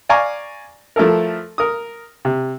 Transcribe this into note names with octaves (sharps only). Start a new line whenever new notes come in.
D5 F5 G#5 A#5 C#6 D6
F3 A3 E4 A4 A#4
A#4 D#6
C3